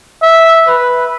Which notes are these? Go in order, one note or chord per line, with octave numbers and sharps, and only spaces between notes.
E5
B4